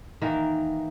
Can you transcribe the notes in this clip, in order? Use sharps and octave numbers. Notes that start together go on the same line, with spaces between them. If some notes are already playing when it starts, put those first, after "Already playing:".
D#3 E3 A#3 A#4